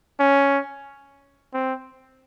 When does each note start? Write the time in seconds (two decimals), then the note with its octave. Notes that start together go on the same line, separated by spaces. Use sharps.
0.19 C#4
1.54 C4